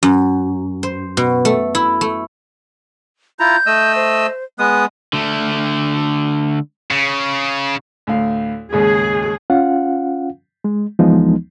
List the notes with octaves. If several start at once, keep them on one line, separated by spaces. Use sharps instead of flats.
F#2
C5
B2
A3
E4
A3
E4 F4 A#5 G6
A3 D#5 E6
C5
G#3 B3 D#6 F#6
D3 A3
C#3
D2 A2 F5
D#2 G#2 C#3 G#4
C#4 F4 F5 F#5
G#3
D2 E3 F3 G#3 B3 D#4